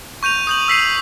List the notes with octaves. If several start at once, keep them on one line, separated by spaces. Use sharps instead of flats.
C#6 G6 D#7 F7
D#6 G6 F#7
E6 B6 C7 D#7